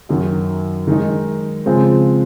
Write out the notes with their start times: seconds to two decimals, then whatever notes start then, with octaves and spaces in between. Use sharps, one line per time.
0.09 F#2 D#3 F#3
0.87 D#3 G#3 D#4
1.66 C#3 F3 G#3 C4 F4